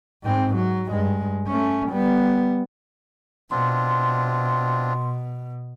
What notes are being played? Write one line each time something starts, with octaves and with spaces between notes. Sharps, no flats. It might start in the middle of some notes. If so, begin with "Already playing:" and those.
G#2 C4
F#3
G2 G#3
A3 C#4
G3 B3
B2 C4 D4 F4 C6